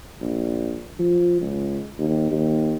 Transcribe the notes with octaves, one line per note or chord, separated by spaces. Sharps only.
A#1
F3
C#2
D#2
D#2